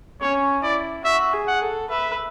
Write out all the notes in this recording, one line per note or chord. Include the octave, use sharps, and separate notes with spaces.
C#4 C#5
E4 D5
F#4 E5
G#4
F#5
A4
B4 E5